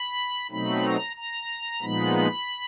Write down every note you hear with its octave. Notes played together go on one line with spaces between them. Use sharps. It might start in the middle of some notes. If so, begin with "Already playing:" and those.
Already playing: B5
B2 F#3 A3 C4 D#4 B5
A#5
A#5
A#2 F3 G#3 B3 D#4 B5